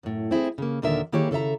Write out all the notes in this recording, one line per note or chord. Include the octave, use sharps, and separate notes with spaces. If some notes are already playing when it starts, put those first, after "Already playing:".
F#2 A2
C4 E4 G#4
C#3 A#3
D#2 A#2 D3 D#3 A#4 E5
D#3 A#3 E4 G4 G#4 C#5
C#3 A4 C5 E5 A#5